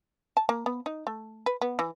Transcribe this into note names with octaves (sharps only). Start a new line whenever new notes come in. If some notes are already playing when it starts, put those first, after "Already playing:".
A5
A#3
B3
D#4
A3
B4
B3
E3